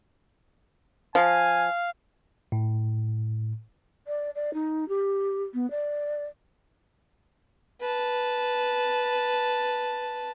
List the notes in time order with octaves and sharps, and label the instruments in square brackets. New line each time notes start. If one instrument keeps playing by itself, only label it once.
[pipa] F3 [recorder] F5 [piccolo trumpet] G#5
[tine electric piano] A2
[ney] D5
D5
D#4
G4
B3
D5
[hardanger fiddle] B4 A5